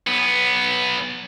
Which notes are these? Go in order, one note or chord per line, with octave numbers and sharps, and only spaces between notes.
B1 B3